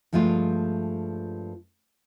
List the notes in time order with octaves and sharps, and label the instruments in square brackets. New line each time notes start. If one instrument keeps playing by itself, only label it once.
[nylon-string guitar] G2 F3 G#3 A3 F4